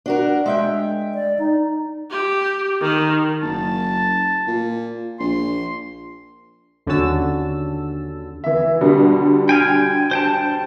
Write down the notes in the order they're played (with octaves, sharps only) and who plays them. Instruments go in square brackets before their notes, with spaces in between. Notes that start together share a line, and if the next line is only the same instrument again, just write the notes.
[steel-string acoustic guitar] D4 F#4 A#4
G#3 E5 G5
[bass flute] D5
D#4
[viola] G4
D#3
[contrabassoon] F#1 [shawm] A5
[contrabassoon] A#2
[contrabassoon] A#1 [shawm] C6
[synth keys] D#2 D3 C#4 F#4 A5 E6
[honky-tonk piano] E3 E5
B2 D3 G3
[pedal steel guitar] G5 G#5 F6
C5 G5 A5